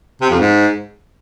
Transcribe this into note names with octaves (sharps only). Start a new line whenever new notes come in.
C3
F2
G#2